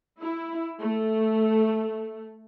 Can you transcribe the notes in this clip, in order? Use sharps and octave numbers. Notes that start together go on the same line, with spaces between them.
E4
A3